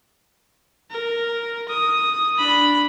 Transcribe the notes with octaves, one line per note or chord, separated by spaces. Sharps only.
A#4
D#6
D4 B5